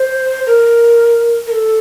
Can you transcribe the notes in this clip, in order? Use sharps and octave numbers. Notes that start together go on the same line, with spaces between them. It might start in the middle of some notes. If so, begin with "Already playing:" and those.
Already playing: C5
A#4
A#4
A4